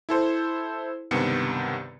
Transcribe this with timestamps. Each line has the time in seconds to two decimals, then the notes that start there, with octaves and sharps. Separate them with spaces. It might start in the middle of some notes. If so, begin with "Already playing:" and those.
0.09 E4 A4 C5
1.11 C#2 G2 C3 D#3 B3 C#7